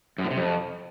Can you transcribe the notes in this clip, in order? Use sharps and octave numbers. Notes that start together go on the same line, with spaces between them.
F#2
A2
C3
F2